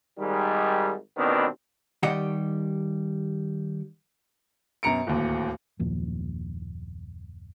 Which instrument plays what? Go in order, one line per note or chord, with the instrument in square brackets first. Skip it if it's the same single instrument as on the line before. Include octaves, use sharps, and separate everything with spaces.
[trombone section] G#1 G#2 D#3 G3
A1 B2 D#3 B3 C4 D4
[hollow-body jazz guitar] D#3 G3 G4 D#5 F#5
[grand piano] F#2 B2 A#5 C#7 D7
D1 D#2
[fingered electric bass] F#1 D#2 A#2 F3